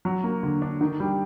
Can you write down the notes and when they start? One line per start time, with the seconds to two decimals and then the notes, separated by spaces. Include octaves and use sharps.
0.05 F#3
0.24 A#3
0.43 D3
0.62 D4
0.81 D#3
1.00 G3